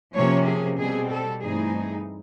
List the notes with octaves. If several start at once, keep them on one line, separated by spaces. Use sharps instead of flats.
C3 F3 A#3 C#4 C#5
G#4
B2 G3 C4 G#4
A4
G2 E3 A3 C4 D#4 G#4